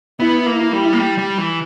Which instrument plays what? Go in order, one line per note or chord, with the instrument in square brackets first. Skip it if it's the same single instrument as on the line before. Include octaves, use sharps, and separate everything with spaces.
[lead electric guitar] B3 [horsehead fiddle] E4
[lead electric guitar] A#3
[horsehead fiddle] E4
[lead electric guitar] G3
A#3
G3
G3
E3